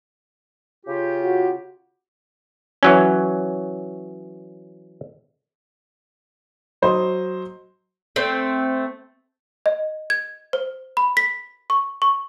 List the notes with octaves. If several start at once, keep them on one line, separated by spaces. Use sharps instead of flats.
C#3 F4 G4
F#4
E3 F#3 C#4
F#3 C5 D#5
A3 C4
D#5
G#6
C5
B5
B6
C#6
C#6